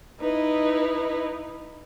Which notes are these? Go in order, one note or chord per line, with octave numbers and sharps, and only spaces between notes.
D#4 E4 B4